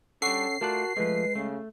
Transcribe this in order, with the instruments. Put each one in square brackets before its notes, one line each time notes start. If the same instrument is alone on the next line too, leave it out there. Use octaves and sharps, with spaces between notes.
[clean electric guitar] G3 D4 [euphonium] C#4 [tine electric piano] A4 F#5 C#6 [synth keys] C7
[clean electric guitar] A3 F4 D5 [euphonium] F#4 [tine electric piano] A#4 A5 F#6
[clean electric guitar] F3 A3 [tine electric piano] G#3 [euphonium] B4
[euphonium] C#3 [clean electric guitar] A3